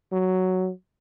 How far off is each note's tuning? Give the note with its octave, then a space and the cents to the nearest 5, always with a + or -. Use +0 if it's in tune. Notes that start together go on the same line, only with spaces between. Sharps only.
F#3 +5